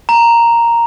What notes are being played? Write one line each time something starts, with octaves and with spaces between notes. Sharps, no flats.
A#5